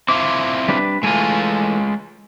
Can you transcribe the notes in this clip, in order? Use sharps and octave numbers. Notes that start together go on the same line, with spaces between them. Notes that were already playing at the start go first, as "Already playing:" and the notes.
C4 E4 F4 D6
G3 D4 B4
E3 G#3 A3 F4 G#5